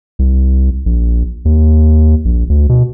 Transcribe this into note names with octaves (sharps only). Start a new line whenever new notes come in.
C2
A#1
D#2
A#1
D2
B2